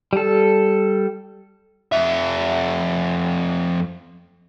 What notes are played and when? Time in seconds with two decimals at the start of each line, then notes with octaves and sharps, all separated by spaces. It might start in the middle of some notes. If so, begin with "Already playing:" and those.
0.13 G3 A4
1.92 F2 E5